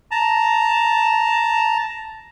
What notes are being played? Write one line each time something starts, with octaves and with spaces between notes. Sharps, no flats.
A5 A#5